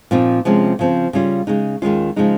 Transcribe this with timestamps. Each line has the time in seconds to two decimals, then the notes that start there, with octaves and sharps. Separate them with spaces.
0.11 A#2 F3 C4 D#4
0.45 C3 F3 G#3 C#4
0.79 C#3 F3 C4
1.13 C#3 G3 C#4 F4
1.47 C#3 G#3 D#4
1.82 D#2 D#3 G#3 C#4 F4
2.16 C#3 F3 G#3 D#4